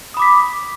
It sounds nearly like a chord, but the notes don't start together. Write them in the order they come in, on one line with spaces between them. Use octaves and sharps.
D#6 B5 D6 B6